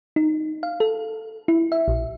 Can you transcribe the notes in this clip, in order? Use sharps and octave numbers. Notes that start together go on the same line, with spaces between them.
D#4
F5
A4
E4
E5
A#1